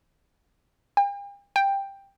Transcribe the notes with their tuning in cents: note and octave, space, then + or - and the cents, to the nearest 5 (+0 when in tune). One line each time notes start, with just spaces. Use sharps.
G5 +45
G5 +10